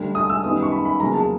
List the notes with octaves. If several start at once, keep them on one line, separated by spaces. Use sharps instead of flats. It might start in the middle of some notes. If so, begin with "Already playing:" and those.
Already playing: D2 D3 G3
D#6
E6
F#2 D#3 G3 B3 D#6
C#6
B5
B5
E2 C#3 F#3 A#3 A#5
A5